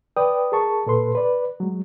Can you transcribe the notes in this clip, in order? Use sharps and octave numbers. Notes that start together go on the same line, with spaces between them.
B4 D5 G5 D#6
G#4 A#4 A5 C#6
A#2 A4 B4 C6
B4 D5
F#3 G#3